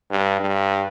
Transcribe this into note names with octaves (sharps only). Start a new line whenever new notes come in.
G2
G2